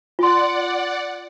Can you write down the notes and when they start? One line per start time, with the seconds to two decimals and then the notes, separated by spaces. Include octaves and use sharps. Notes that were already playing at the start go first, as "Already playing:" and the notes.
0.19 F4 D5 F#5 C6